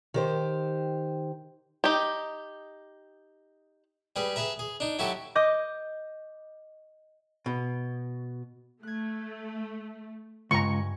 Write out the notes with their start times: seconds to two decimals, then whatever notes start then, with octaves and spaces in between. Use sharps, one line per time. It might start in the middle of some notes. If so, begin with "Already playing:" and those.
0.14 D#3 G4 C5
1.84 D#4 G4
4.16 G3 G#4 B4
4.36 G#4 B4 E5 A#5
4.59 G#4
4.80 D4 D#4
4.99 F#3 E4 F#4 G4 A4
5.35 D#5 D6 G6
7.46 B2
8.83 A3 F#6 G#6
10.51 C#2 G2 G#5 A#5 C#6